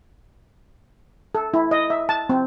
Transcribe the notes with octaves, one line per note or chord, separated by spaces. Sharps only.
A4
E4
D#5
E5
A5
C4